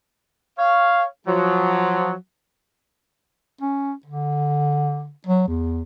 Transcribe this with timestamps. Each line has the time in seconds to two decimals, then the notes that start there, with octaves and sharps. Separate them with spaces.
0.58 C#5 F5
1.26 F3 F#3
3.61 C#4
4.06 D3
5.27 F#3
5.48 E2